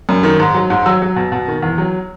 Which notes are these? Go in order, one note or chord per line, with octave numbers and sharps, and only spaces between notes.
F#2
D#3
G#2
F#3
G#2
F#3 E6
F#3
B2
B2
D#3
E2
F#3